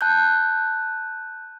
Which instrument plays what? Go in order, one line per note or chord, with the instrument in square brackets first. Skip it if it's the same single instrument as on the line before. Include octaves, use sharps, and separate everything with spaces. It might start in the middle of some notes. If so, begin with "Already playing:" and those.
[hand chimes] A5 F#6 G6